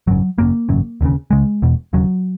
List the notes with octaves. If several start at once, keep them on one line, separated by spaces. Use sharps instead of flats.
G#1 F#2 C#3 F#3
G#1 F#2 C#3 A#3
G#1 F#2 C#3
E1 D#2 C#3
C#2 C#3 G#3
E1 E2 B2
E1 D#2 C#3 F#3